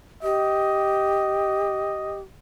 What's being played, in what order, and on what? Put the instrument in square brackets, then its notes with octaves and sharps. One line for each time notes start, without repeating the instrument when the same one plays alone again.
[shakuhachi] G4 [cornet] D#5